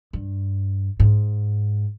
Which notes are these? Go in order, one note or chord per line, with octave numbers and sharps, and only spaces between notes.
G2
G#2